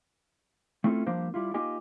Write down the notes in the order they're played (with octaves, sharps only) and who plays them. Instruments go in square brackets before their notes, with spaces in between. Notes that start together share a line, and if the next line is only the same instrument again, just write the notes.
[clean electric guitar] A3 C4 C#4 E4 F4 A4
F3 G3 A#3 D4 C5
G3 E4 F4
A#3 D#4 F4 G4 D#5 G#5